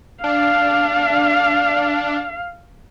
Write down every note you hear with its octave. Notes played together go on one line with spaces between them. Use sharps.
D4 F5